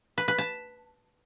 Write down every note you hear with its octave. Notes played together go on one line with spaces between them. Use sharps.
B4
B4
A5